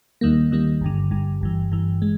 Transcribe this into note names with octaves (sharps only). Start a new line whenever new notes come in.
D#2 D#3 G3 A#3
D#2 D#3 G3 A#3
G1 G2 D3
G1 G2 D3
G1 G2 E3
G1 G2 E3
E3 G#3